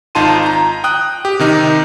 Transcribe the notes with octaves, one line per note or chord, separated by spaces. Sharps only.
G#1 D#4 F4 A5 C6 D#7
A#5 G6
G5 D#6 F#6
G4
C3 D#3 D#4